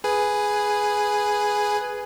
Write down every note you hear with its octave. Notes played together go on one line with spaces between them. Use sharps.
G#4 B4 G#5